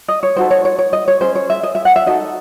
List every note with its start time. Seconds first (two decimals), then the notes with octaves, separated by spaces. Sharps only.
0.08 D#5
0.23 C#5
0.36 D#4 F#4 A4 C5
0.51 C#5
0.65 C#5
0.79 C#5
0.93 D#5
1.08 C#5
1.21 C#4 G#4 C5
1.35 C#5
1.50 E5
1.63 D#5
1.75 E5
1.85 F#5
1.96 E5
2.06 D#4 F#4 A4 D#5